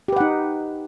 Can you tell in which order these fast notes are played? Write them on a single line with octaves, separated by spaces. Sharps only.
G4 B4 F#5 D#4